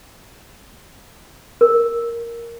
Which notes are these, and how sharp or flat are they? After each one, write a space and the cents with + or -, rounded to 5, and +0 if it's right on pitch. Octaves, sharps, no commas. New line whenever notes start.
A#4 +0